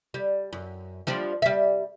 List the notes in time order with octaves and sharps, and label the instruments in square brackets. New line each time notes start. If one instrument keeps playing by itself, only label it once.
[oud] G3
F#2
F3 G3 D4
G3 E5